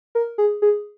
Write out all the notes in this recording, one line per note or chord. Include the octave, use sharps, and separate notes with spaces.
A#4
G#4
G#4